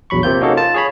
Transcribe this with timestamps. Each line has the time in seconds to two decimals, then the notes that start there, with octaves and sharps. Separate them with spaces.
0.10 A#1 E2 F#3 B5 C#6
0.23 C3 A#3 C4 F4 G6
0.41 A#3 C#4 D#4 F#4 G#4 A4
0.57 F4 A5
0.74 G#4 C#5 B5